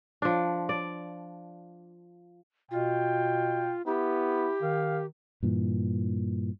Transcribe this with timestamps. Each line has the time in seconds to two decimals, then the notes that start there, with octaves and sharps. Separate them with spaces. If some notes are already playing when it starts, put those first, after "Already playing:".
0.22 F3 D4
0.69 D5
2.71 B2 F4 G5
3.86 B3 E4 G4
4.62 D#3 F5
5.43 G2 A#2 E3